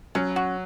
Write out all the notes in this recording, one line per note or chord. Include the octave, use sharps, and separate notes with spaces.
F#3 C#4
F#4